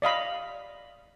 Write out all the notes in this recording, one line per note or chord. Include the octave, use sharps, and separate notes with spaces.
D5 D#5 F5 B5